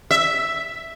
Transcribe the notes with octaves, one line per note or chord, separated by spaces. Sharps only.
E5